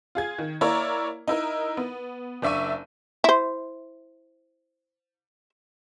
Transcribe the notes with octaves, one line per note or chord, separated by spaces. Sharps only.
F4 G#4 G#6
D#3
A#3 E4 A#4 C#5 D5 A#5
D#4 E4 A#4
B3
F#1 D4 E5 C#6 D#7
E4 C5